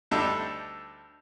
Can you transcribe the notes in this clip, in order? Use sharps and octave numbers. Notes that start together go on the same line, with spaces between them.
D2 G3 D4 D#4 A4 E5